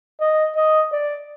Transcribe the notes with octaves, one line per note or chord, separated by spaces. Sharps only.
D#5
D#5
D5